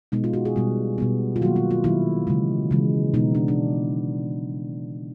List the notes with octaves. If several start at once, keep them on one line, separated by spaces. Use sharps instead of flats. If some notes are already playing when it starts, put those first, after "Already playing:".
B2 G#3 B3 D#4
F4
F#4
G#4
B2 G3 B3
B2 G3 B3
F4
D#3 F#3 A#3 F#4
F4
F4
D#3 F#3 A#3 E4
C#3 E3 G#3
C#3 E3 G#3
B2 G#3 B3 D#4
D4
D4